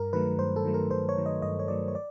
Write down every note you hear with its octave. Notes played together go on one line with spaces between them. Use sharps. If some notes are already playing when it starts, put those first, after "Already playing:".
Already playing: G2 A#4
D#3 F#3 A3 B4
G2 C5
A4
D#3 F#3 A3
A#4
G2 C5
C#5
D#3 F#3 A3
D#5
G2 D#5
C#5
D#3 F#3 A3 D5
C#5
D5